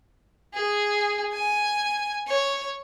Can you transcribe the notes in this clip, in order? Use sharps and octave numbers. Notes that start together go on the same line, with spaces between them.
G#4
G#5
C#5